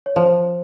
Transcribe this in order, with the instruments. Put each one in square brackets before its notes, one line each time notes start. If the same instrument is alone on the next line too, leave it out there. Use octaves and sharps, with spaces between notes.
[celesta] C#5
[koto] F3 [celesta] C5